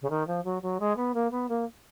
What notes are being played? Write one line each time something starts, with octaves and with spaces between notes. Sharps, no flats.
C#3
D#3
F3
F#3
F#3
G#3
B3
A#3
B3
A#3